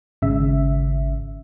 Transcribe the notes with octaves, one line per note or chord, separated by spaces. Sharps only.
G#1 C#3 E5